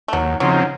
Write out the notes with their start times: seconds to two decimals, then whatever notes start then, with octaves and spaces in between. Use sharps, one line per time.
0.08 A3
0.13 D#2 F#3
0.40 C#3 F3 F#3 C4 D#4